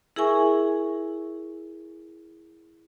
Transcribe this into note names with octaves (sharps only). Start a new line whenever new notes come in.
E4 G#4 A#4 E5 G#5 C#6